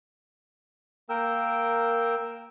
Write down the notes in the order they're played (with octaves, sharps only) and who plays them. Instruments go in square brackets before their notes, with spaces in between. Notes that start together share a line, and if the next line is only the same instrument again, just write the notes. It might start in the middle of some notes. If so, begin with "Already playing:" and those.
[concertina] A#3 A#4 G5 E6